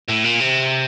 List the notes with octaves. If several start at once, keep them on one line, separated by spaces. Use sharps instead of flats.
A2
A#2
C3